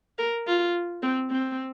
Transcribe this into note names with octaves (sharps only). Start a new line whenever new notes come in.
A#4
F4
C4
C4